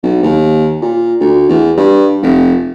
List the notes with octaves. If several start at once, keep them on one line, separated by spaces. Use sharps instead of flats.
B1
D#2
A#2
D2
E2
G2
F1